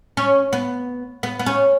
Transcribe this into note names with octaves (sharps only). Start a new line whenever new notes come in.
C#4
B3
B3
B3
C#4